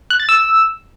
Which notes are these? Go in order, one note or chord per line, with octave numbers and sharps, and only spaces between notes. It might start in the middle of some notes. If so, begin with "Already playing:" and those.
F#6
A6
E6